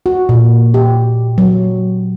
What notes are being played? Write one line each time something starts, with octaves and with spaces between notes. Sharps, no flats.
F#4
A#2
G4
F#3